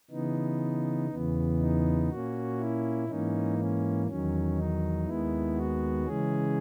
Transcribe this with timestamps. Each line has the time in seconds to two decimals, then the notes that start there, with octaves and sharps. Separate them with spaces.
0.10 C#3 E3 B3 D#4
1.10 E2 C#3 E3 B3
1.59 D#4
2.09 A#2 A#3 C#4 F#4
2.59 E4
3.08 G#2 E3 A#3 C#4 D#4
3.59 C#4
4.07 E2 D#3 F#3 C#4
4.57 D#4
5.07 D#2 D#3 G#3 B3 E4
5.57 F#4
6.06 C#3 E3 G#3 C#4 G#4